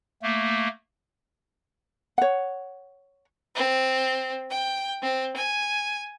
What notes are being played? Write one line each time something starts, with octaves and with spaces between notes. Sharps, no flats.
A3 A#3
C#5 F#5
C4
G5
C4
G#5